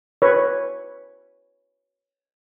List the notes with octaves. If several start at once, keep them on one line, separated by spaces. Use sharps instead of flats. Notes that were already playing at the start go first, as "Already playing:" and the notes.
B4 C#5